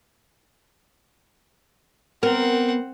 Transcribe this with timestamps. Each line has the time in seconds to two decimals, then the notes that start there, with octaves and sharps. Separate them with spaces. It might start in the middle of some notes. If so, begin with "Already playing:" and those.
2.23 B3 C4 A#4 F#5